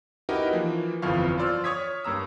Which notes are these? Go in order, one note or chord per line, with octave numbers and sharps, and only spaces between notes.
D#4 E4 F#4 G4 A#4 B4
E3 F3 A#3
G1 F2 E3 F3 F5 C#6
F4 C5 D5 E6 F6
C#5 C#6 D#6 G#6 B6
G2 A#3 A#5 E6